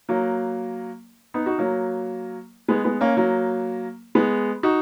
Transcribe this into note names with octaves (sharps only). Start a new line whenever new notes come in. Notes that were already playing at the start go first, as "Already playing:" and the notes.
F#3 A#3
B3 D#4
D#4 F#4
F#3 A#3
G#3 B3
G#3 B3
A#3 C#4
F#3 A#3
G#3 B3
D#4 F#4